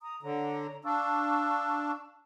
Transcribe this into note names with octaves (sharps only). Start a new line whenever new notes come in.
A#5 D#6
D3 C#5 A#5
D4 F5 C#6 E6